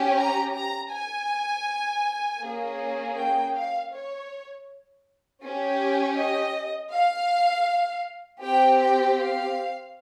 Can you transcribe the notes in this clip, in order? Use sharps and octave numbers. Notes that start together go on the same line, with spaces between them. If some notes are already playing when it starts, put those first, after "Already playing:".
Already playing: C#4 G4
A#5
A#5
G#5
A#3 C#4 G#4
G5
F5
C#5
C#4 G4
D#5
F5
C4 G4 G5
G5
F5